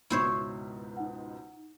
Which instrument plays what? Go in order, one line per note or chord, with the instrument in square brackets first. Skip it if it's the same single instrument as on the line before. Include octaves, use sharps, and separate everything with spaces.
[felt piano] C#2 G#2 B2 [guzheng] E4 C5 C#5
[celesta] D#4 F#5